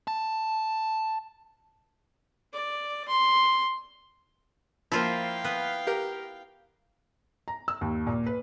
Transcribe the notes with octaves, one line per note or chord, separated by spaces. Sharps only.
A5
D5
C6
F3 A#3 E4 F4 F5 G5
B3 B4
G4 A#4
A#5
E6
D#2
A#2
B4